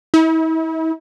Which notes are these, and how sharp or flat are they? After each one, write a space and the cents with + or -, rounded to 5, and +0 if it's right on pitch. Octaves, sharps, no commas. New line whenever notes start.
E4 -40